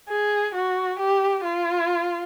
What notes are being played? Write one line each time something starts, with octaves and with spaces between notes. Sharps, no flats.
G#4
F#4
G4
F4